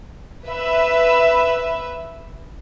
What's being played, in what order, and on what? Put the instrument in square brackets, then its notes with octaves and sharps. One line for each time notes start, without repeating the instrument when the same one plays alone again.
[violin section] B4 E5